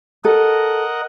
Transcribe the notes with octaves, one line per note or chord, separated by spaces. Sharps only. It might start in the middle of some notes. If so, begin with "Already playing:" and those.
A4 A#4 D#5 F#5